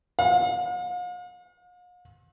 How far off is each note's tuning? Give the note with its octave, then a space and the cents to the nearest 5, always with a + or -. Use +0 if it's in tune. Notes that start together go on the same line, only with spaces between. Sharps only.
F5 +45